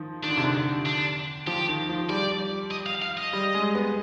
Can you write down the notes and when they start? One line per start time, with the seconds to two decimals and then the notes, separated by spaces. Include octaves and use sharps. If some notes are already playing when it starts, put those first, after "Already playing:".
Already playing: D#3 F3
0.23 D#3 D4
0.30 D3
0.37 C3
0.45 D3
0.86 D4
1.47 F3 G4
1.68 D#3
1.89 F3
2.10 G3 D5
2.71 D#5
2.86 F5
3.02 F5
3.17 D#5
3.33 G3
3.54 G#3
3.75 B3